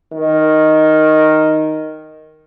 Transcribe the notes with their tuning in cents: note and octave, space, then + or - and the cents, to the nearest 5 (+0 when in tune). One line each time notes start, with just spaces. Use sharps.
D#3 +0